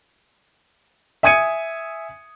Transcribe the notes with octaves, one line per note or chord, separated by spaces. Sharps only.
E5 G#5 D#6 G#6 C#7 D#7